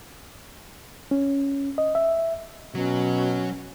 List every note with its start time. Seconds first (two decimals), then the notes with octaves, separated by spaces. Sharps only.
1.11 C#4
1.78 D#5
1.95 E5
2.75 B2 F#3 C#4